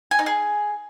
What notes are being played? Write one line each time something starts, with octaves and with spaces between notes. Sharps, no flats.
G#5
D#4
G#4